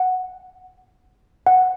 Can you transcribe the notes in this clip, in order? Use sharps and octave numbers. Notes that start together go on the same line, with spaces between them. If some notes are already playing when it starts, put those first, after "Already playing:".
Already playing: F#5
F#5